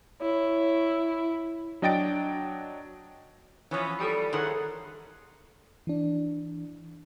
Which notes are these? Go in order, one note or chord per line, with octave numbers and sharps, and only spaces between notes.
E4 C#5
F#3 D4 D#5 G5 A6 D7
E3 F3 B3 C#4
G3 A4 D#6 C#7
G2 D#3 E3 C#4 G#4 A#4 C5 F#5
E3 D4